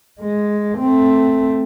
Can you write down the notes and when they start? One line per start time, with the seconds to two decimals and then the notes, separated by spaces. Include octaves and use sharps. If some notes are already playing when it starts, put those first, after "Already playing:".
0.20 G#3
0.78 A3 C4